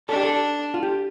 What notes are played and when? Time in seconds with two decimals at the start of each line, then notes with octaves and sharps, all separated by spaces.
0.09 D4 A4
0.16 G4
0.23 A4
0.74 F4
0.83 G4